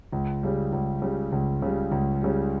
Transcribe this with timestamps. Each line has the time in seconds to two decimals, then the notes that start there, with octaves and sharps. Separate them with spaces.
0.12 C#2
0.43 C#3 G3
0.73 C#2
1.02 C#3 G3
1.32 C#2
1.62 C#3 G3
1.92 C#2
2.22 C#3 G3